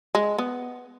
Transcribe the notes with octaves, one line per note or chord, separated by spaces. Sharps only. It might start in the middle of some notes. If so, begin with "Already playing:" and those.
G#3
B3